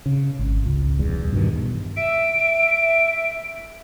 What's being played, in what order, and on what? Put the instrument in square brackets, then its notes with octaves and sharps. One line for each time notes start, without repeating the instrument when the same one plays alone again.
[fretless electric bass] C#3
G#1
C#2
D1 B1 E2 G3
B1 G2 B2 D#3
[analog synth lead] E5 [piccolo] D7